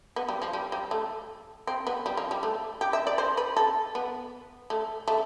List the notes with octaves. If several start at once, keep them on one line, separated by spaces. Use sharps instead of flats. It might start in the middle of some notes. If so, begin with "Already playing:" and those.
B3
G3
F3
G3
G3
A3
C4
B3
G3
F3
G3
A3
G4
E5
D5
C5
B4
A4
B3
A3
A3